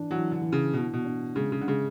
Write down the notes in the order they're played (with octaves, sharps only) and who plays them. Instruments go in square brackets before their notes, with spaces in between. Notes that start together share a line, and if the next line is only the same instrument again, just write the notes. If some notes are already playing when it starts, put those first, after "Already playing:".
Already playing: [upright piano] E3 D4
[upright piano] E3 [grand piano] F#3
[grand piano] D3
[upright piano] E3
[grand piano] C#3
[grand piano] B2 [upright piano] E3
[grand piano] B2
[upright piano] D4
[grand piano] C#3 [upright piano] G#3
[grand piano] C#3
D3
[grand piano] C#3 [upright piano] G#3